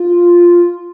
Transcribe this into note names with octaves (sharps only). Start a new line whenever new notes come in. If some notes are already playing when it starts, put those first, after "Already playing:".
Already playing: F4